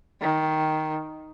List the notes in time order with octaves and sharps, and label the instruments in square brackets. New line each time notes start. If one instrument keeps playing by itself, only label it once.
[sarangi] D#3